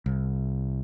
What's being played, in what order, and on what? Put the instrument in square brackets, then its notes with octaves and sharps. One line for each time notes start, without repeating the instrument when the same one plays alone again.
[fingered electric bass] C2